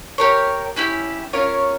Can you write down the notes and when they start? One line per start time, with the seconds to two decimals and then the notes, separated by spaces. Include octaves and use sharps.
0.18 G4 A#4 C#5
0.76 C#4 E4 G4
1.33 C#4 F4 A#4 C#5